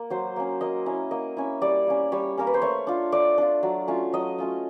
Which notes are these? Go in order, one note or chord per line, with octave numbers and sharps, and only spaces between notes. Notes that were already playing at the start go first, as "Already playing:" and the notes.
Already playing: A#3
F#3 C5
A#3 C#4
A#3 D#5
C#4 E4
A#3 D#5
C#4 E4
G3 D5
A#3 C#4
G3 C#5
A#3 C#4 A#4
B4
C5
A3 C#5
D4 F4
A3 D5
D4 F4
F#3
A3 C#4 F4
F#3 D#5
A3 C#4 F4